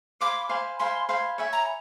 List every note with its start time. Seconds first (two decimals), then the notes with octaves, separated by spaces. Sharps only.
0.21 C5 F5 G#5 B5 D6
0.49 C5 F5 G#5 B5
0.79 C5 F5 G#5 B5 C6
1.09 C5 F5 G#5 B5
1.38 C#5 E5 G#5 B5
1.53 A#5